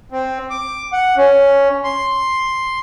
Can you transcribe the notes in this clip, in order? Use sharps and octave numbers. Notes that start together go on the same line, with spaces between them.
C4
D6
F#5
C#4
C6